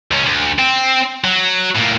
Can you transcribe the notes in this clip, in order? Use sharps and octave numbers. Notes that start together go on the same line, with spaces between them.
C#2 C#4
D2
C4
F#3
A2 A#3